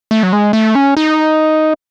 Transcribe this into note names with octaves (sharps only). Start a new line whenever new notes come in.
A3
F#3
G#3
A3
C#4
D#4